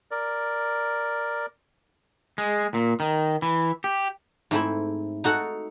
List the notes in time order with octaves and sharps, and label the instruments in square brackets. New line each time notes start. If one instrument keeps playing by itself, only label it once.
[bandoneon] A#4 D5
[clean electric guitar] G#3
A#2
D#3
E3
G4
[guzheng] G#2 A3 C4 E4
D#4 F#4 A4 F#5